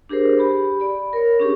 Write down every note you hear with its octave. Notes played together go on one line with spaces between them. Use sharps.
D4 G4 G#4 A#4 C5
G4 B5
D5 B5
A#4 C#5
C#4 D4 G4 G#4